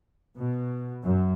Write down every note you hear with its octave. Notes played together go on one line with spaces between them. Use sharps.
B2
F#2